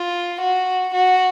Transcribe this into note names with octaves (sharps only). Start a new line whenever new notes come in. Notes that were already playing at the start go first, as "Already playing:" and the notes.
Already playing: F4
F#4
F#4